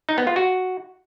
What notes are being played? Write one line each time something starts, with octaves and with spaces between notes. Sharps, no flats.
D#4
B3
F4
F#4